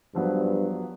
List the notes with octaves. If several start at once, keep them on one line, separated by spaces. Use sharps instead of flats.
G2 F3 F#3 B3